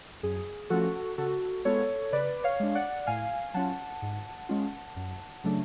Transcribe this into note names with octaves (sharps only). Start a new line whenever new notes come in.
F#2 G#4
F3 A3 C#4 F4 F#4 A4
C#3 F#4 A4
G#3 B3 F4 A4 C#5
C#3 B4 D5
C#5 F5
G#3 D4
D5 F#5
A2 F5 G#5
F#3 C#4 F4 F#5 A5
G#2
G#3 C#4 F4
F#2
C#3 F#3 A3 D4